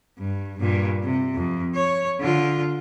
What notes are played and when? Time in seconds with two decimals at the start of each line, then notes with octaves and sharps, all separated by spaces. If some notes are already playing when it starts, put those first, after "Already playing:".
0.19 G2
0.59 G2 A#2
1.03 C3
1.35 F2
1.74 C#5
2.20 D3 F4